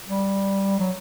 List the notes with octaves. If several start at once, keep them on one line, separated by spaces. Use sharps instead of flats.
G3
F#3